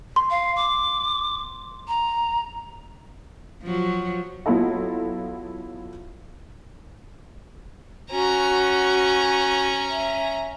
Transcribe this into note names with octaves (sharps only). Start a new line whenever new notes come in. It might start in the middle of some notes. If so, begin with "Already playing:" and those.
C6
F5
D6
A#5
F3 F#3
F#3 B3 E4 F4 A4 D#5
C#4 F#4 A#5
E5